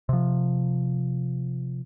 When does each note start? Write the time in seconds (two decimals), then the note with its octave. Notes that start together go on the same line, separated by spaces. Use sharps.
0.09 C3 F3